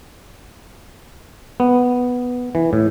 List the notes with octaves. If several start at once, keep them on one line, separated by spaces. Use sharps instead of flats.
B3
E3
A2